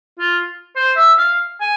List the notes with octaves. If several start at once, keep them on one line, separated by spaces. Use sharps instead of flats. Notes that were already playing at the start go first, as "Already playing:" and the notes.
F4
C5
E5
F5
G#5